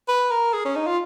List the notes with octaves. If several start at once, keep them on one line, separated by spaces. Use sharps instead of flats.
B4
A#4
G#4
C#4
D#4
F4